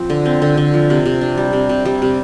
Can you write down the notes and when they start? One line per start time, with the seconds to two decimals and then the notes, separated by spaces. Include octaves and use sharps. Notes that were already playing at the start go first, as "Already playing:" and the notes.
Already playing: F3 C4
0.10 D3
0.25 C4
0.42 D3
0.57 D3
0.74 F3
0.90 C3
1.06 C3
1.21 D4
1.38 G3
1.53 C3
1.69 C3
1.85 G3
2.02 C3